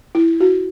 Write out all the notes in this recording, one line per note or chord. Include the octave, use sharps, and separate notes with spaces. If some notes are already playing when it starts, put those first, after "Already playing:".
E4
F#4